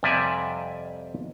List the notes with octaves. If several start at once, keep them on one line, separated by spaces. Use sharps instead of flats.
F2 C3 G3 D5 E5 G#5